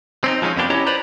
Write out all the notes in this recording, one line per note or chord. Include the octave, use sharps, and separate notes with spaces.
C4 C#4 D#4
F3 G#3 B3 C#4 D#4
F2 A#3 B3 D4 G4
C#4 E4 G4 C#5 D#5 A#5
G4 B4 C5 D5 A#5 B5